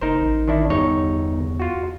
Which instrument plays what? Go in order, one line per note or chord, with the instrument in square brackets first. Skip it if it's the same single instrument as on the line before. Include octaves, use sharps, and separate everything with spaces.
[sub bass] F#1 [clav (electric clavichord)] D#4 A#4 C5
[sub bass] A1
[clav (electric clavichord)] D#3 D4 E4
[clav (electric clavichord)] G1 D#4 C#5 [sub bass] E2
[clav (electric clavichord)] F4 F#4